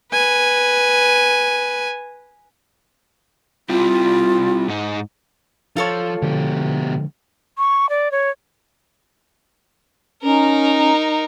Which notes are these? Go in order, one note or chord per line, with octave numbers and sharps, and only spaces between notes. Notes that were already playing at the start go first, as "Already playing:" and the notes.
B4 G#5
G3 C4 E4 F4
G#2 D#4
F3 F4 A4 C#5
B2 D3 F3 G#3 G4
C#6
D5
C#5
C#4 D#4 A#4